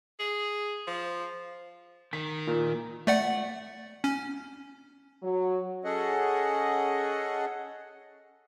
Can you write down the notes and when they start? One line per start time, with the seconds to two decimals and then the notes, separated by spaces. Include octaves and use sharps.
0.20 G#4
0.87 F3
2.13 D#3 B6
2.47 A#2
3.07 A3 D5 F#5
4.04 C#4
5.22 F#3
5.84 C#4 G#4 A4 D#5 F#5